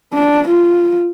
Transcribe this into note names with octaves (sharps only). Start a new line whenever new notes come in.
D4
F4